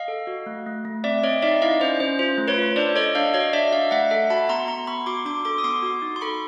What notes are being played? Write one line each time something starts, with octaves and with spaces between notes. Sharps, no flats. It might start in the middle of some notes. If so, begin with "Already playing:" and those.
Already playing: D#5 F5
A4
F#4
A3
A3
A3
C4 D5 E5
C4 C#5 D#5
D#4 D5 E5
E4 D#5 F5
C#4 C5
C#4 C5
F4 C5
A3
B4 C#5
F4
D4 C5 D5
A4 C#5 D#5
D4 D#5 F5
F#4 C#5 D#5
D4 D5 E5
D4 D#5 F5
A3 E5 F#5
A4 E5 F#5
F#4 A5 B5
B3 A#5 C6
B3 A#5 C6
B3 B5 C#6
F#4 C6 D6
D4 C6 D6
A4 C6 D6
D#6
B3 C6 D6
F#4
D#4
C6
A4 B5 C#6